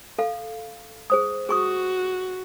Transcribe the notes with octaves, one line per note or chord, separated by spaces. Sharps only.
A4 F5
G#4 C5 D#6
F#4 G#4 C#6 D#6